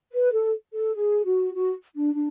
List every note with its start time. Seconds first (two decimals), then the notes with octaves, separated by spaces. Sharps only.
0.13 B4
0.32 A4
0.74 A4
0.94 G#4
1.25 F#4
1.54 F#4
1.95 D4
2.15 D4